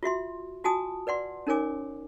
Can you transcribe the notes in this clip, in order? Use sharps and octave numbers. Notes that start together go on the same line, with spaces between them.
F4 F#4 E5 C6
F4 F#4 G#5 A5 D#6
B4 D5 F#5 C6
C#4 D#4 A#4 C#5 G#5 D6